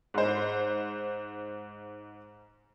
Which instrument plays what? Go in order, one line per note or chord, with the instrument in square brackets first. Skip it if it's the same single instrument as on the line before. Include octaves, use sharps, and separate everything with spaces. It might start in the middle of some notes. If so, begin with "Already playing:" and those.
[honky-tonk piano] G#2 C5